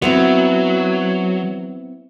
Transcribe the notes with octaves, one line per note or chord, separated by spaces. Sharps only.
F#3 B3 C4 E4